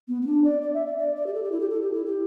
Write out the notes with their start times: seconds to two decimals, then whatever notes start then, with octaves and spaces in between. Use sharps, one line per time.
0.08 B3
0.22 B3
0.27 D4
0.44 D5
0.62 D5
0.74 E5
0.86 D5
0.98 D5
1.16 D5
1.27 G4
1.34 A4
1.43 G4
1.52 E4
1.60 G4
1.70 A4
1.82 G4
1.93 E4
2.06 G4